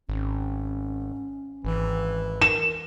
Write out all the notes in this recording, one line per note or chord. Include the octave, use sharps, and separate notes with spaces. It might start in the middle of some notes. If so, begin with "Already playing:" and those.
G#1 C#4
G#1 E3
A#4 E7